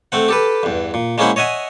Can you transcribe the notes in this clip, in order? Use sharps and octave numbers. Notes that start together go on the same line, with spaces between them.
A3 C4 F#5
G4 A4 B4
E2 G2
A#2
G#3 A#3 C#4 E4 C5 F#5
C#5 D#5 E5 F#5 G#5